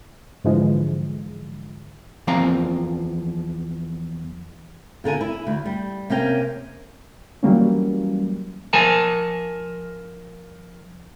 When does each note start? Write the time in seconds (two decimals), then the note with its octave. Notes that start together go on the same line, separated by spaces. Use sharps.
0.44 G#2 D3 E3 F3 G#3
2.27 E2 F3 A#3 C4 F5 A#5
5.04 A#2 D3 A#4 G#5
5.21 E4
5.47 D2
5.65 G3
6.10 C3 A#3 C#4 G5
7.43 E3 F#3 G3 A#3 C#4
8.73 F3 A#4 G#5 A5